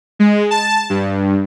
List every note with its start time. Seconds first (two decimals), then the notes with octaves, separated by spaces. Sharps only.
0.19 G#3
0.51 A5
0.90 G2